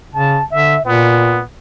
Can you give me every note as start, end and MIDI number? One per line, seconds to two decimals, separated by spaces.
0.14 0.39 49
0.14 0.45 81
0.51 0.76 50
0.51 0.81 76
0.85 1.43 46
0.85 1.43 59